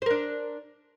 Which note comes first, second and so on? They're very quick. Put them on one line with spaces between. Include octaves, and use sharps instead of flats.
C5 A#4 D4